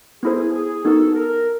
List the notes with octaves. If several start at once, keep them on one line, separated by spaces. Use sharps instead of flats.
B3 E4 G#4 A4 C5
G#4
B3 D#4 F#4 A4 A#4
A#4